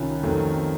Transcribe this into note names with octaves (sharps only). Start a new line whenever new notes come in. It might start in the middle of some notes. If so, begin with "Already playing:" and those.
Already playing: C2 D#3 C#4 F4
F2 D#3 F#3 A3